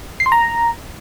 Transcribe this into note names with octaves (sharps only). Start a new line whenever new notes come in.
C7
C6
A#5